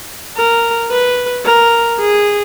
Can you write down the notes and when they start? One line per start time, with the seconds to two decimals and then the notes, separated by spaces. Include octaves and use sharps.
0.37 A#4
0.91 B4
1.45 A#4
2.00 G#4